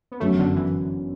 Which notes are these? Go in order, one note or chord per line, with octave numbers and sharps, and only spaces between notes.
B3
G1 F#2 F#3 A3
D3
E3